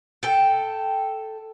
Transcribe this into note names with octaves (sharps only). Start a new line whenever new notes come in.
A4 G5